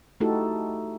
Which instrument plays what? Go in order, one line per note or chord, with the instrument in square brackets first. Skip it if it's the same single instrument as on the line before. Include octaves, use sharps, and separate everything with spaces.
[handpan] A3 D#4 E4 F#4 G4 A4